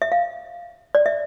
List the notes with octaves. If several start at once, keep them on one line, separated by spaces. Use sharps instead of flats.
E5
F5
D5
E5